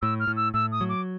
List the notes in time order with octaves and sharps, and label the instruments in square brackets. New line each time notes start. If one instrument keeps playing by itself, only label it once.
[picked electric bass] A2 [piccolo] E6
[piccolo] F6
[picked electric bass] A2
[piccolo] E6
[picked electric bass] A2 [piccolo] E6
[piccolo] D#6
[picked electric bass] F#3
[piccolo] D6